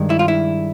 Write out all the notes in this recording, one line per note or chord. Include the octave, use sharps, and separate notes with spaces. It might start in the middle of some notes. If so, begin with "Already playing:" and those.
Already playing: G2 D#3 G#3
E4
F4
E4